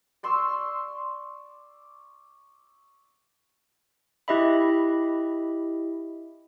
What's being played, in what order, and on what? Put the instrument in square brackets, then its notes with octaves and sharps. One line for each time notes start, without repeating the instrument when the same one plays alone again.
[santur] D5 C6 C#6 E6
[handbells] E4 G4 D#5 E5 B5